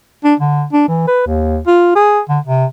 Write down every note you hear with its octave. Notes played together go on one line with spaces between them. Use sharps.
D4
D3
D4
E3
B4
D#2
F4
G#4
D3
C3